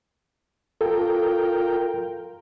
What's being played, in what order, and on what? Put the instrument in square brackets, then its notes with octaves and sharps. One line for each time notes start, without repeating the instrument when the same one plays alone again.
[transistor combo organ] F4 A#4 G5 [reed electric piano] A4